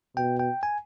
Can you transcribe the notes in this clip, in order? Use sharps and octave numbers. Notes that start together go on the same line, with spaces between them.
B2 G5
G5
G#5